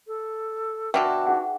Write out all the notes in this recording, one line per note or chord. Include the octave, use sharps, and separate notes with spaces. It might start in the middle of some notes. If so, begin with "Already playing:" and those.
A4
B2 D3 F#4 A4 B4 E5 G5
D#4 G#4 F#5